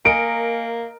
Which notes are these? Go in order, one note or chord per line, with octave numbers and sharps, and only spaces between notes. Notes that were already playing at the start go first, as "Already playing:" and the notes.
A#3 A#4 D#5 G#5 A#5 C#7 D7